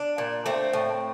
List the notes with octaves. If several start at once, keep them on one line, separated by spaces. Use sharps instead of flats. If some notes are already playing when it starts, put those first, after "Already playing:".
Already playing: D4
A#2
A3 C4
A2